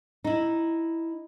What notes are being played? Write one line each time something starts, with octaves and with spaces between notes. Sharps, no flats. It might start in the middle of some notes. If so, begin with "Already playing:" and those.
D#4 E4